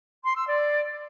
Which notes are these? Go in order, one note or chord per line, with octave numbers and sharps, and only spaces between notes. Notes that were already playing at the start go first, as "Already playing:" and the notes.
C6
E6
D5